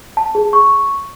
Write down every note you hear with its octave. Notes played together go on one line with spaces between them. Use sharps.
A5
G#4
C#6